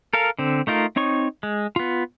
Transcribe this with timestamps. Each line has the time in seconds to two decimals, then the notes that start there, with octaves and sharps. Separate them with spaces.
0.13 A4 A#4 F5
0.39 D3 C4
0.67 A3 D#4 F4 A#4
0.96 C4 D#4 C#5 C#6
1.43 G#3
1.76 B3 F4